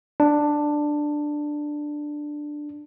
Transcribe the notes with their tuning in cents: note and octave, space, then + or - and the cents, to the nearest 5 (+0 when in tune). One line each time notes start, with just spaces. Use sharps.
D4 +10